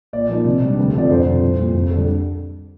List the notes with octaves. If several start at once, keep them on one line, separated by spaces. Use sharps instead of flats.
A#2 D5
F3 A#3 D#4
C3
G3 D4
D2
D3 F3 C4 D5
F2 C5
C3 F3
C2
A#2 F3
F2
D3 G3 D4 A4